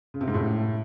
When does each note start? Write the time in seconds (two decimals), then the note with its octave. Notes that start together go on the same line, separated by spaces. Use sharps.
0.14 C#3
0.21 C3
0.27 G#2
0.34 A2